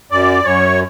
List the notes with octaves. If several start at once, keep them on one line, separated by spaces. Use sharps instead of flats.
F#2 D5
F#2 C#5